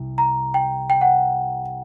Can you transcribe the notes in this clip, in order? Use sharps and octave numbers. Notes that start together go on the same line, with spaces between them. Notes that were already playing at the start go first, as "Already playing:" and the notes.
Already playing: C2
A#5
G5
G5
F#5